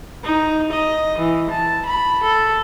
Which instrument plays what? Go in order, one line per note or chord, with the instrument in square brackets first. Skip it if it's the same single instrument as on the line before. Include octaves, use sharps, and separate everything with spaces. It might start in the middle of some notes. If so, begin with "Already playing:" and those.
[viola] D#4
D#5
E3
A5
B5
A4